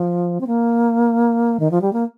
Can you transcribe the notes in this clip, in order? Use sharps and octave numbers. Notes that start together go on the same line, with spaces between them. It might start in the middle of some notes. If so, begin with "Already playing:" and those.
Already playing: F3
C4
A#3
D#3
F3
G3
A#3